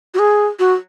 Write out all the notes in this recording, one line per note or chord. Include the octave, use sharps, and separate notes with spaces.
F#4
G#4
F#4